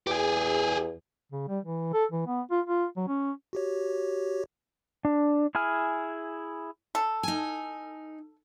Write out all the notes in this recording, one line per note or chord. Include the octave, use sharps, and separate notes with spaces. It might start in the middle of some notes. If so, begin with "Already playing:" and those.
E2 G4 G#4
C#3
G3
E3
A4
E3
B3
F4
F4
F#3
C#4
F#4 G4 C#5
D4
E4 G#4 G#5 F6
A4
D#4 G#5